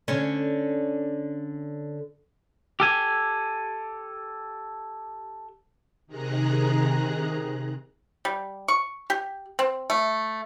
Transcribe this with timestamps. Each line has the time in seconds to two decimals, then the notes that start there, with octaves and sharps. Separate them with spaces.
0.08 D3 C#4
2.80 G4 A4 G#5
6.07 C3 D#3 G#4 A#5 F#6
8.25 G3
8.68 C#6
9.10 G4
9.59 C4
9.90 A3